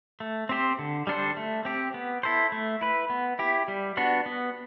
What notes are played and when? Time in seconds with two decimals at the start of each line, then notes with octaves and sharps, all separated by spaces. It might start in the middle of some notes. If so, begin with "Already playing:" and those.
0.20 A3
0.49 C4 G4 C5
0.79 D3
1.07 G3 D4 A4 C5
1.37 A3
1.65 C4 G4
1.94 B3
2.23 E4 A4 C5
2.52 A3
2.81 E4 B4
3.10 B3
3.39 E4 G4
3.68 G3
3.97 B3 D4 F#4
4.26 B3